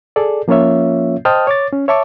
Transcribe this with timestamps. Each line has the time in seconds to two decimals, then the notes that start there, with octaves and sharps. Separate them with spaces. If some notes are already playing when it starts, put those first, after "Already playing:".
0.16 G#4 A4 D5
0.48 F3 A#3 C#4 F4 C#5 E5
1.25 C5 D#5 G5 A5 D#6 F6
1.47 C#5 D6 A6
1.72 C#4
1.88 C#5 E5 A5 C#6 D6